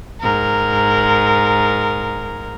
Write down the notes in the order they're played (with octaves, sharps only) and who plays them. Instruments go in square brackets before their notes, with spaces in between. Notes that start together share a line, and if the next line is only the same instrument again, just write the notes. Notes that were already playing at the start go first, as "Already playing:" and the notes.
[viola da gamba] G#2 A#4